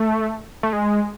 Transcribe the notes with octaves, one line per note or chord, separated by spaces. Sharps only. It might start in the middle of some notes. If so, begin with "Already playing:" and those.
Already playing: A3
A3
G#3